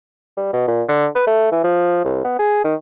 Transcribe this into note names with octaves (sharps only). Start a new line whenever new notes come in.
G3
B2
A#2
D3
B4
A3
E3
F3
C2
B3
G#4
D#3